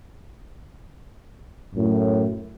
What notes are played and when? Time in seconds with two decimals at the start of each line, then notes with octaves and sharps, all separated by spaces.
1.75 F#2 A2